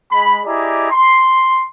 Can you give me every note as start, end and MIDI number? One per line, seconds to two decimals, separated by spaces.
0.12 0.38 56
0.12 0.38 83
0.45 0.90 64
0.45 0.90 67
0.45 0.90 68
0.45 0.90 74
0.45 0.90 75
0.45 0.90 82
0.90 1.64 84